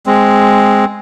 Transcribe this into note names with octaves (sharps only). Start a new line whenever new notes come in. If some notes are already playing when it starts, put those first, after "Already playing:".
G#3 C4